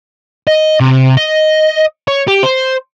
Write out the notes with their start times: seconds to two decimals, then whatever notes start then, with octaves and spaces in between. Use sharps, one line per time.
0.47 D#5
0.80 C3
1.17 D#5
2.08 C#5
2.28 G4
2.43 C5